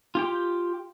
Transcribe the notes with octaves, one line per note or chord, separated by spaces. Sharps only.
F4 G4 G5